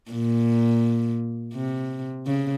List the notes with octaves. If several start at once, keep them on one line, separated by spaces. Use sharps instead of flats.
A#2
C3
C#3